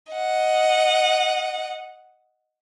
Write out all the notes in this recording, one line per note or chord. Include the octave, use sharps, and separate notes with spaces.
D#5 F#5